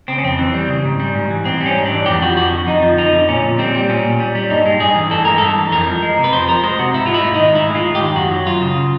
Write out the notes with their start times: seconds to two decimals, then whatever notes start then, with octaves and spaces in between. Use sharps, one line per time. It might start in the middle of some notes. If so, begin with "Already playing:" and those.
0.08 C#3 C4
0.18 C#4
0.24 F2 C4
0.39 E3
0.54 G3
0.69 C#3
0.85 G#2
1.00 G3
1.15 G#2
1.31 E3
1.45 G#2 C4
1.61 G3
1.66 C#4
1.76 G#2
1.86 D4
1.91 E3
2.06 F2 G4
2.22 F3 F#4
2.36 F2 F#4
2.52 D3
2.67 F2 D#4
2.82 F3
2.98 F2 D#4
3.13 D3
3.28 A#2 C#4
3.43 A#2
3.59 G3 C4
3.75 G3
3.90 A#2 C#4
4.04 A#2
4.20 G3
4.35 G3
4.50 G2 D#4
4.66 G#3
4.80 G2 G#4
4.96 E3
5.11 G2 A4
5.25 G#3 A#4
5.38 G2 A4
5.56 E3
5.72 F2 A#4
5.87 F3
6.02 G#3
6.18 C3
6.24 B4
6.33 F2 C5
6.48 F3 A#4
6.63 G#3 C5
6.79 C3 F#4
6.93 G#2 E4
7.06 F4
7.09 G#3 E4
7.24 G#2
7.34 D#4
7.40 D#3
7.55 G#2 E4
7.70 G#3 F4
7.85 G#2
7.95 G4
8.01 D#3
8.15 F#2 F#4
8.31 F#3
8.46 F#2 F4
8.61 C#3